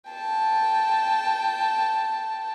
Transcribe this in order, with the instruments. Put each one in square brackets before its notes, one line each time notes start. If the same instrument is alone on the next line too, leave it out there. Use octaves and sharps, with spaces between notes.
[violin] G5 A5